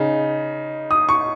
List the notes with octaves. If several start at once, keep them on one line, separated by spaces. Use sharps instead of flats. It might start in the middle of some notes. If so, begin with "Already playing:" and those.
Already playing: C#3 D#4
D#6
C#6